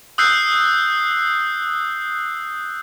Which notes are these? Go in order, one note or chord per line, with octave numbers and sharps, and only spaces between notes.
D#6 E6 F#6 G6 C7